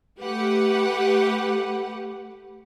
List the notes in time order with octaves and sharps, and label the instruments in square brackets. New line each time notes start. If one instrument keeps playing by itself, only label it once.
[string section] A3 G4 B4 F#5